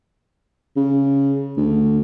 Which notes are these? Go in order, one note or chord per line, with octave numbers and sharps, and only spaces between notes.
C#3
D2